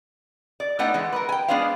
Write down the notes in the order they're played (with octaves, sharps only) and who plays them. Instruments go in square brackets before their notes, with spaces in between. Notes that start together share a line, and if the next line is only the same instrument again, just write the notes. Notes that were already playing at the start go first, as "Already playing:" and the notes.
[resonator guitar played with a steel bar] D5
A3 B3 D4 D#4 F#5
E3 G#3
A#4 B4
G5 G#5
G#3 B3 D4 G#4 C5 F5